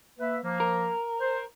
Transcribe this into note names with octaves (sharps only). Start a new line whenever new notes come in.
A#3 B4 E5
F3 A#3
A#4
C5